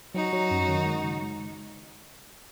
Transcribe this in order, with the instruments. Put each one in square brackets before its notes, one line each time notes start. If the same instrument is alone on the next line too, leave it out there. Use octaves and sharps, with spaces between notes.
[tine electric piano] F#3 [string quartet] D#4 F#4
[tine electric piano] F#3
F#2
D#3
G#3
C#3
G#3